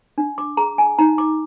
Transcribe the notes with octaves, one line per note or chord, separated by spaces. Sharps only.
D4
D6
G#4 A#5
G#5
D#4 A#5
D6